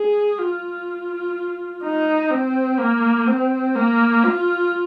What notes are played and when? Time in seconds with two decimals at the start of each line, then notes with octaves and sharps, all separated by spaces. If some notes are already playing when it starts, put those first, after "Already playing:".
Already playing: G#4
0.38 F4
1.83 D#4
2.31 C4
2.79 A#3
3.27 C4
3.75 A#3
4.23 F4